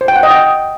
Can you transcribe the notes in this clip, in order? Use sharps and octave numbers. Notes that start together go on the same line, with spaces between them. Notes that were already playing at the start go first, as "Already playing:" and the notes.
C5
G5
F#5
D#5
G5